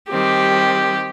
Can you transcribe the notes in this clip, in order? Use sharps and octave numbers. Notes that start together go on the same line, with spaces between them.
D#3 G3 C4 G4